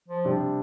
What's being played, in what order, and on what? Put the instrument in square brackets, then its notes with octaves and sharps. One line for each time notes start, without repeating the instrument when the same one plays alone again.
[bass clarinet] F3
[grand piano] C3 G3 D4 G4